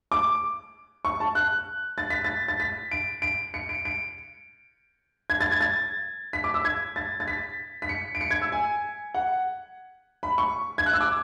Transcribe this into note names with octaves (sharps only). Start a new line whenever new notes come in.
D6
C#6
A5
F#6
A6
B6
A6
A6
B6
D7
D7
C#7
D7
D7
G#6
A6
G#6
A6
B6
D6
E6
G#6
A6
A6
B6
B6
C#7
D7
C#7
G#6
E6
G#5
F#5
B5
C#6
G#6
F#6
E6
D6